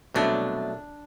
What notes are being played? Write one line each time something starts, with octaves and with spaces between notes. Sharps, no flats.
C2 B2 F#3 A3 D4